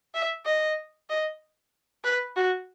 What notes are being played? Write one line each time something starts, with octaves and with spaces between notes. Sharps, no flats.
E5
D#5
D#5
B4
F#4